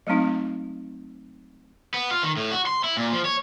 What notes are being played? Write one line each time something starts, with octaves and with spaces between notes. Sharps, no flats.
F#3 G#3 A3 C4 D#4
B3
F4
D#3
A2
F#4
C6
E4
A#2
F3
C#5